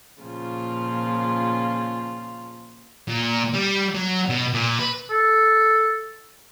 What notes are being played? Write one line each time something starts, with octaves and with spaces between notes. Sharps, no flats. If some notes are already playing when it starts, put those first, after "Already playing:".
A#2 C#3 F3 F4
A#2
G3
F#3
B2
A#2
B4
A4